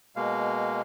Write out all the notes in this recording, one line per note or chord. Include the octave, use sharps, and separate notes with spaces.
B2 G#3 A#3 F5